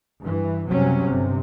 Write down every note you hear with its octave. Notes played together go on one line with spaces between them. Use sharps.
G2 E3
F#1 C3 F#3 G3 C#4
G1 C3